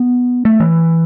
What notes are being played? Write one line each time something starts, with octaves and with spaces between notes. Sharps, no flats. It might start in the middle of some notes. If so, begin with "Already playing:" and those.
Already playing: B3
A3
E3